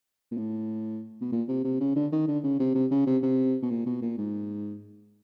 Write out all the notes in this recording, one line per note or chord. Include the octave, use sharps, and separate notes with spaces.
A#2
A2
B2
A#2
C3
C3
C#3
D3
D#3
D3
C#3
C3
C3
C#3
C3
C3
B2
A#2
B2
A#2
G#2